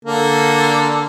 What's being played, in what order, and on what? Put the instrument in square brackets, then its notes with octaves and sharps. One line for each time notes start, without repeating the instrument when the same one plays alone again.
[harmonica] D3 A#3 A4